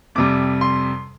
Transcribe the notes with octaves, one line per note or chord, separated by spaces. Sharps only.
F2 C3 G3 D6
C6